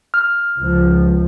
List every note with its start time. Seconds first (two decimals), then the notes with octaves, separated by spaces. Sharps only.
0.14 F6
0.60 C#2 F3